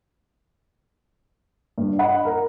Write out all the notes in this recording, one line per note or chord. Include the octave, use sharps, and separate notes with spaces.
G2
D#5 F#5 B5
A#4